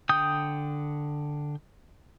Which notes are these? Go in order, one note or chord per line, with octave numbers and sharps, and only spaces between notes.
D3 G5 D#6 G6